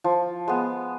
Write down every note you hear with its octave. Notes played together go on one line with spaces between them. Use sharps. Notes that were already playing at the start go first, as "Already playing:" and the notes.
F3
G#3 B3